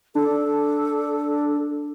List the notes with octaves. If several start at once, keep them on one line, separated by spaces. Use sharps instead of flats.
D4 A4